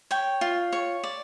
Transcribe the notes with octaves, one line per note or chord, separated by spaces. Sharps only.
C#5 G5
F4
C#5
D5